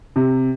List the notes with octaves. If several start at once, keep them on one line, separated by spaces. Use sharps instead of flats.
C3